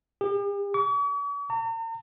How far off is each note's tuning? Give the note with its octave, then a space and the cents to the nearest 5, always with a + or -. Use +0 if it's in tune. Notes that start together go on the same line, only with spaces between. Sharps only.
G4 +45
C#6 +45
A#5 -45